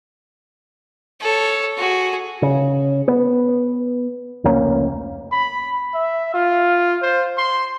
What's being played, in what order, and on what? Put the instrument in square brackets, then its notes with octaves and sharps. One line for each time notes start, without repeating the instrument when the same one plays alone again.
[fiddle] A4 C#5
F#4 G#4
[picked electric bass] C#3
B3
F1 C#2 A#3 C#4
[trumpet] B5
E5
F4
C5
C6